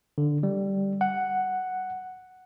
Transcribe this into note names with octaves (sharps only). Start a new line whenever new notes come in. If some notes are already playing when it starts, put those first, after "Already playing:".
D3
G3
F#5